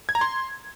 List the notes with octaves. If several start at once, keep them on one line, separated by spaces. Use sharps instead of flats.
G#6
A#5
C6